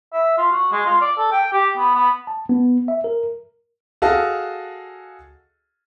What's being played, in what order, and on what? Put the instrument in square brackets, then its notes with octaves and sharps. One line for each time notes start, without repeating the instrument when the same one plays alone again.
[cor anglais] E5
F4
F#4
G#3
F4
D5
A4
G5
G4
B3
B3
[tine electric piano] A5
B3
E5
A#4
[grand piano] F#4 G#4 A4 D#5 F5 A5